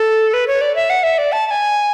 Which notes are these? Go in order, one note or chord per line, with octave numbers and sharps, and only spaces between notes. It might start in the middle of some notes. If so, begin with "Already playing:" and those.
Already playing: A4
B4
C#5
D5
E5
F#5
E5
D5
A5
A5
G#5